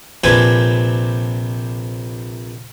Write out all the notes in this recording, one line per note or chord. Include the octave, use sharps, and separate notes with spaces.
A#1 C3 D4 G4 B4 G#5